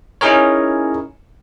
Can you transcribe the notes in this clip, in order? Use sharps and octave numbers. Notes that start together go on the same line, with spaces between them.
C#4 D#4 E4 G#4 A#4 C#5